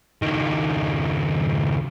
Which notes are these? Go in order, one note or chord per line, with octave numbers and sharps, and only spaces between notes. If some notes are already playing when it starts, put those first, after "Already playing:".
C#2 D#3